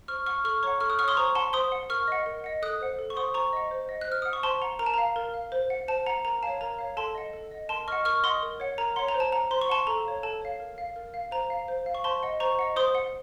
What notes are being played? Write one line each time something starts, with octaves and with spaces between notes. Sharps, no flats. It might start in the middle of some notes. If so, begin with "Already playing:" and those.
C5 C#6 F6
F#5 C#6 F6
A4 C#6 F6
C#5 F#5 A#5 C#6
A4 C#6 F6
D#6 F#6
F#5 C#6 F6
C#5 C6 D#6
C5 A#5 C#6
F#5 A5 C6
C5 C6 D#6
F#5
A#4 C#6 F6
D#5 F#5
A#4
D#5 F#5
A4 D#6 F#6
C5 F#5
A4
C#6
C5 F#5 C6 D#6
C5 A#5 C#6
D#5 F#5
C5
D#5 F#5
F#6
C5 F6
F#5 D#6
C#6
C5 A5 C6
F#5 A#5
A#4 A#5
A5
F5 A#5
A#4
F5
C5
F#5
C5 A5
F#5 A#5
A#4 A#5
C#5 F5 A5
A#4 A#5
C#5 F5
A4 A5 C6
D#5 F#5
A4
D#5 F#5
A#4 A5 C6
D#5 F#5 C#6 F6
A#4 C#6 F6
D#5 F#5 C6 D#6
A#4
C#5 F#5
A#4 A#5
C#5 F#5 C6
A#5
C5
A5
F#5 A#5
C5 C6
C#6
F#5 A5 C6
A4 A#5
C#5 F5
A4 A5
C#5 F5
A#4
F5
A#4
F5
C5 A#5
F5
C5
F5
C#6
C5 A5 C6
D#5 F#5
C5 A#5 C#6
D#5 F#5
C5 C6 D#6
F#5